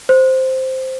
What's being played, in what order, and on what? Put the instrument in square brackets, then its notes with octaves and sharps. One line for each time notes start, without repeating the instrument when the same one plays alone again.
[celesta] C5